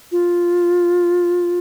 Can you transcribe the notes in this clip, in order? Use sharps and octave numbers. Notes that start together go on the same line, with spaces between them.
F4